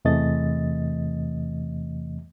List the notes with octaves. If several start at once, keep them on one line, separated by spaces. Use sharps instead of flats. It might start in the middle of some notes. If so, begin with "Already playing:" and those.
E2 C3 E3 A3 D#5 A6